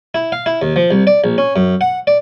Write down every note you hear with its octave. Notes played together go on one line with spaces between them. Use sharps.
E4
F5
E4
D#2
F3
C2
D5
A#1
C#4
F#2
F#5
D5